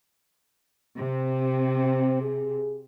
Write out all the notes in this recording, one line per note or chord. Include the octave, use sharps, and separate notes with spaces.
C3 C4
G#4